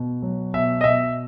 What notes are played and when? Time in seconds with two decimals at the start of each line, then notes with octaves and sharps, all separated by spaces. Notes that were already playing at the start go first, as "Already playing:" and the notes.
Already playing: B2
0.22 F#3
0.54 B2 E5
0.81 D#5
0.84 B2 E5